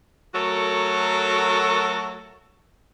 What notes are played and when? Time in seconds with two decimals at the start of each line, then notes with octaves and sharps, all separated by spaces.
0.34 F#3 A3 F#4 A4 A#4 C#5